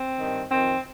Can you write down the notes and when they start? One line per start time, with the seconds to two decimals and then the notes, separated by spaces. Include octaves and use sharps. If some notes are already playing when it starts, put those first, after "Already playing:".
Already playing: C4
0.18 G2 D#3
0.50 F2 D#3 C4